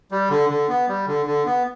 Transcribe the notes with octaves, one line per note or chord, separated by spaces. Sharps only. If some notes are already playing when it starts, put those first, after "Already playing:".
G3
D3
D3
B3
G3
D3
D3
B3